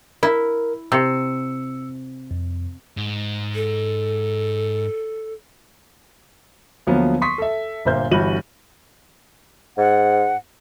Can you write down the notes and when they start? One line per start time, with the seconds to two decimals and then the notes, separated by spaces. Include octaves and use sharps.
0.23 E4 A#4
0.92 C3 E6 C#7
2.31 F2
2.97 G#2
3.55 A4
6.87 D2 F3 F#3 A#3 B3
7.22 C6 C#6 D#6 B6
7.38 A4 E5
7.85 G1 A#2 A#3 C5 E5 G6
8.11 G1 G2 E3 F#4 D#7 F#7
9.78 G#2 F#5